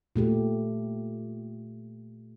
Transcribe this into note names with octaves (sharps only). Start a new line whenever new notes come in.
A#2 A3 G4